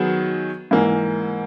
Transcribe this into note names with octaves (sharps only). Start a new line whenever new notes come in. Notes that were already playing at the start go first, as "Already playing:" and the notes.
Already playing: D#3 F#3 B3 G#4
G#2 E3 A#3